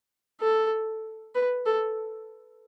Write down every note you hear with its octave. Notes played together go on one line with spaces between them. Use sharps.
A4
B4
A4